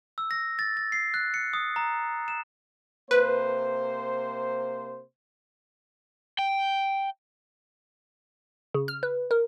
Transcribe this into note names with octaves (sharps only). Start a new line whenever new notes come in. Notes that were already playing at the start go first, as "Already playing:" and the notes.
E6
A#6
A6
A6
C7
F#6
C#7
D#6
A#5
E7
C3 A#3 B4 C5
G5
C#3
F6
B4
A#4